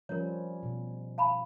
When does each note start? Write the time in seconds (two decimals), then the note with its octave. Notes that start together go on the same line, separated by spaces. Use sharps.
0.09 F3 G3 C#4 A#4 C#5
0.63 B2
1.18 F5 A5 B5